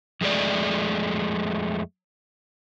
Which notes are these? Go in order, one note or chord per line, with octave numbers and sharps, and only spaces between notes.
F2 G#3 A3 D5